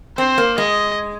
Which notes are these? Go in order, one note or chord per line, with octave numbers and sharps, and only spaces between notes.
C4 C5
A#3
G#3 D#5